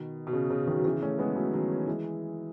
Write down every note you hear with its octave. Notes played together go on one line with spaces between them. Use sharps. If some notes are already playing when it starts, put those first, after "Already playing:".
Already playing: B2 D#3
B2
C#3
C#3
B2 D#3
F#3
C#3 E3
A3 C#4
G#3 B3
F#3 A3
D#3 F#3
E3 G#3